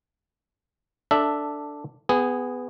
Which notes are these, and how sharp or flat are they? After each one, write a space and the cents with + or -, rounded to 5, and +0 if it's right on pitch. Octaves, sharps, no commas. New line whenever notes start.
D4 +0 A4 +15 E5 +0
B3 +15 G#4 -15